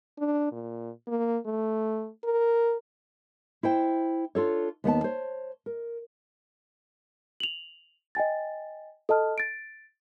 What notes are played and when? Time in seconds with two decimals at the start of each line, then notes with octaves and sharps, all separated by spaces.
0.18 D4
0.51 A#2
1.07 A#3
1.46 A3
2.24 A#4
3.63 E4 C5 G5
4.35 D4 F4 A4 C#5
4.84 D#2 B3 F#5 A5
5.04 C5 C#5
5.66 A#4
7.40 F7 F#7
8.15 D#5 G5 G#5 A6
9.09 A4 D#5 A5 F6
9.38 A6 D7